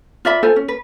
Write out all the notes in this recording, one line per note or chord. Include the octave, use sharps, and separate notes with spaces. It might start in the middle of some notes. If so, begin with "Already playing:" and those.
F4 D5 E5 B5
F4 A4 C5 G#5
C#4
B4